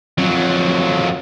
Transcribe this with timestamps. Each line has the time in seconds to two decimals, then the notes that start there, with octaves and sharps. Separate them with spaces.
0.18 F2 F#3